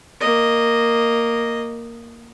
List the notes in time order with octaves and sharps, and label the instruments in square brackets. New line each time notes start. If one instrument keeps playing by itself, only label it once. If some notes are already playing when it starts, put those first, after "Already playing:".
[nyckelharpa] A#3 D#5